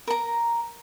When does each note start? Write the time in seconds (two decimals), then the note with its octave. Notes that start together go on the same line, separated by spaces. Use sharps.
0.07 A#4 A#5